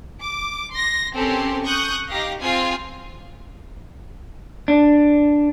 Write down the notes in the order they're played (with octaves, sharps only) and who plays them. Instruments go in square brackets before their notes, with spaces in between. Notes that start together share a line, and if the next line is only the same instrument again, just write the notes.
[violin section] D6
C6 A#6
C4 C#4 G4 A4 A#4 C6
C#6 D#6 F#6 G6
D#4 G4 F5 A#6
C4 F4 G#4 G#5 C7
[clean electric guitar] D4